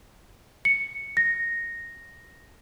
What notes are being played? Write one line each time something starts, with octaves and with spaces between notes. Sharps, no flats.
C#7
A#6